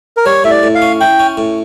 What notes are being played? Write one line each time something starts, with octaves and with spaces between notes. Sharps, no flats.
A#4
G3 C#5
A2 E5
D5
A2
F5
C#4
E4 G5
C#4
A2